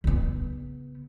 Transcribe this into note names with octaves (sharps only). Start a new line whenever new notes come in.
C#3 B3